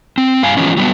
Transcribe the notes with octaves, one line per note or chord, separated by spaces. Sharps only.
C4
G2 F5 G#5
E3 F3 G#3 B3 C#4
F#3 G3 A#3 B3